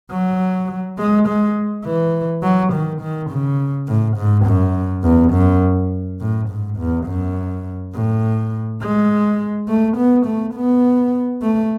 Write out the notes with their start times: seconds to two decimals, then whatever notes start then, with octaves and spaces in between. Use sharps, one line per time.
0.11 F#3
0.99 G#3
1.28 G#3
1.85 E3
2.43 F#3
2.72 D#3
3.01 D#3
3.30 C#3
3.88 A2
4.17 G#2
4.46 F#2
5.04 E2
5.33 F#2
6.21 A2
6.49 G#2
6.78 E2
7.07 F#2
7.95 A2
8.82 G#3
9.68 A3
9.96 B3
10.26 A3
10.55 B3
11.42 A3